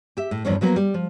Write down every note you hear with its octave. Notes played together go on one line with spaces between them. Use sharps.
G4 E5
A2
E2 G2 D#3 F3 C#4 C5
F3 F#3 A#3 B3
G3
F3